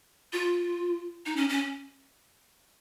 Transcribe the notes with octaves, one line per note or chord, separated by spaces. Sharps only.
F4
D#4
C#4
C#4